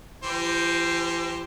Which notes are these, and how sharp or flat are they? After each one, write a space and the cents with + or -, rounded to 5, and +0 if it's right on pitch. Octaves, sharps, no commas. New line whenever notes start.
E3 +45 G4 +0 C5 +0